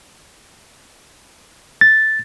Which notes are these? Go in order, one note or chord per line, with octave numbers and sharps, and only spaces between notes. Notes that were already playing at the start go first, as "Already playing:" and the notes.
A6